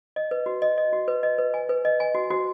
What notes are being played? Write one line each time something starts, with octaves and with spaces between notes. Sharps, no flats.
D#5
B4
F#4
D#5
D#5
F#4
B4
D#5
B4
G#5
B4
D#5
G#5
F#4
F#4